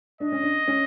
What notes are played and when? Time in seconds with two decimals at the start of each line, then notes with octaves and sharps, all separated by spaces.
0.20 D4 D#5
0.32 C#4
0.43 D4
0.68 C#4